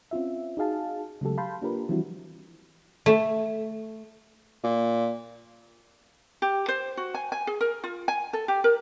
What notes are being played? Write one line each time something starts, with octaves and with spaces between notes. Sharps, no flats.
C4 C#4 F4 E5
D#4 F#4 G#4 F5 A5
C#3 F#3 G#3 A3 G4 A4
F5 A5 B5 C6 G6
A#3 D4 F4 G4 A#4 B4
E3 F3 G3 C4 E4 F#4
A3
A#2
G4
C5
F#4
G#5
G#5
G#4
A#4
F4
G#5
A4
G4
A#4